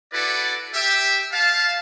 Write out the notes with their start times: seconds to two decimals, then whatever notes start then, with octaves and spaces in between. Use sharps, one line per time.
0.14 E4 F#4 A4 B4 D5
0.74 G4 E5
1.32 F5 A5